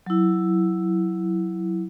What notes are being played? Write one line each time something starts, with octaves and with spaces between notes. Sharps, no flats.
F#3 E4